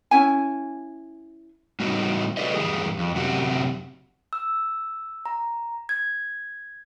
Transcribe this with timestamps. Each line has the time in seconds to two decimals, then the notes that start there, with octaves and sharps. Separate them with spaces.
0.11 C#4 E4 G#5
1.80 A2 G3 A3 D#4 F#4
2.37 F#4 A4 B4 D5 D#5
2.54 E2 G2 F#3 G4 G#4
2.98 F2
3.14 F#2 C3 F#4 G4
4.33 E6
5.26 A#5
5.89 G#6